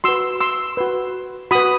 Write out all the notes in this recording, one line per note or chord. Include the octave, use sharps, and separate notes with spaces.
F#4 B4 C6 E6
C6 E6
F#4 B4
F#4 B4 B5 D#6